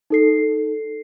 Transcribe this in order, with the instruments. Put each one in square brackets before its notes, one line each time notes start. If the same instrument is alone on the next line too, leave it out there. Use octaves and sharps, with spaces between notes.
[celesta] D#4 A4 C7